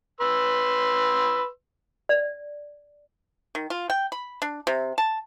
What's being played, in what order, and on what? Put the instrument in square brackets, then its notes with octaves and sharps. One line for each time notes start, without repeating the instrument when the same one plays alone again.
[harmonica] B4 C6 E6
[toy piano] D5
[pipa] D#3
F4
G5
B5
D4
C3
A5